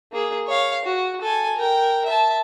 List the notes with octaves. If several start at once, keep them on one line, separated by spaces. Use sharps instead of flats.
A#3 G#4
C#5 F5
F#4
A4 G#5
A#4 G5
E5 A5